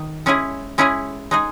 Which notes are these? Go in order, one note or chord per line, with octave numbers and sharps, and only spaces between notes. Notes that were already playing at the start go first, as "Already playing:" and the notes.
Already playing: D#3 D#4
G#3 C#4 E4 G#4
G#3 C#4 E4 G#4
G#3 D#4 G#4